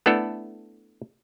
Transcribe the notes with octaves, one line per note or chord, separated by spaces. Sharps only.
A3 B3 D4 E4 A4